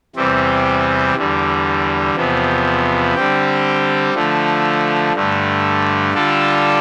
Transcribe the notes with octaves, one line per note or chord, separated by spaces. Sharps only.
E2 C3 E3 G3 C4
E2 D3 G3
E2 C3 F3 B3
D3 G3 C4 G4
D3 F3 A3
G2 D3 A3
D3 G3 D4 F4 A4